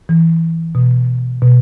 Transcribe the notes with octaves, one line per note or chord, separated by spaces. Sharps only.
E3
B2
B2